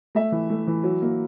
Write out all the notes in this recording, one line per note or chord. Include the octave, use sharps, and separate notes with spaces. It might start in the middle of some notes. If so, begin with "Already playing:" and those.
A3 E5
E3
A3
E3
F#3
A#3